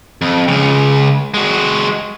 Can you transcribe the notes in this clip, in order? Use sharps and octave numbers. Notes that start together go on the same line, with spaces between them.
F2
C#2 C#3
G#3 F#4